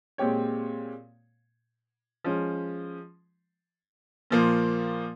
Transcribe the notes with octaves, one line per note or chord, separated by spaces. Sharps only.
A#2 G#3 C4 G4 C#5
F3 G#3 C#4
A#2 F3 A#3